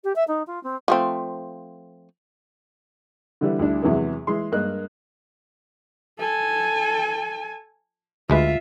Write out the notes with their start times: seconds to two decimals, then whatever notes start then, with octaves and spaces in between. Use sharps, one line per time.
0.04 G4
0.15 E5
0.27 D#4
0.47 F4
0.63 C4
0.88 F3 A3 C4
3.41 D3 E3 G3
3.59 D2 G3 D4 E4
3.82 E2 C3 E3 F#3 G#3 B3
4.27 E3 G#3 C6
4.52 G2 G#3 A#3 A#4 D#5 F#6
6.19 A4 G#5
8.30 D2 G#3 F4 B4 E5